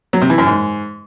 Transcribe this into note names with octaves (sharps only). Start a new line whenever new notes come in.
F#3
C3
E3
F#2
G#2